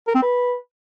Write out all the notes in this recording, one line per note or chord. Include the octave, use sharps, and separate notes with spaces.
A#4
C4
B4